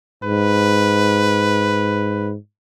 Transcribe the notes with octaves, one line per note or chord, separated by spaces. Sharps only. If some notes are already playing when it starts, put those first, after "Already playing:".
G#2 B4